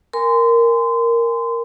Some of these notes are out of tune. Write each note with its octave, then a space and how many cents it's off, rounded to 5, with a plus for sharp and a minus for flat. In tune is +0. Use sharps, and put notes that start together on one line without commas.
A#4 +0 G#5 -15 C6 -30